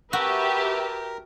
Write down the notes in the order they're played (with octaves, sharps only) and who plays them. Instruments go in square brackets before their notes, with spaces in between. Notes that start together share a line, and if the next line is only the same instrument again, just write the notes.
[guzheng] F#4 [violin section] G4 [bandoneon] A#4 [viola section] B4 E5 A5